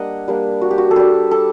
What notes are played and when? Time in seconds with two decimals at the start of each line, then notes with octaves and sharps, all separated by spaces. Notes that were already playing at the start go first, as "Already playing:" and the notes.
Already playing: G3 A#3 D4 D#5 F#5
0.28 G3 A#3 D4
0.61 F#4
0.71 G4
0.78 F#4
0.91 A4
0.96 G3 D4 G4
1.31 A4